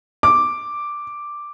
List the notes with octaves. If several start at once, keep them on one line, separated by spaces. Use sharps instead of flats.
D6